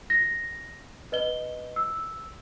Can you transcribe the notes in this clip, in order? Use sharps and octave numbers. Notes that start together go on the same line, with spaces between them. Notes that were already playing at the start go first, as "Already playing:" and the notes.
A#6
B4 D#5 G7
E6